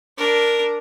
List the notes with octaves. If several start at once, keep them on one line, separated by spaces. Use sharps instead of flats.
D4 A#4